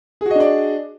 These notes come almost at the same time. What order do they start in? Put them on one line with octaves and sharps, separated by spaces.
G#4 F#4 D#5 D4 D5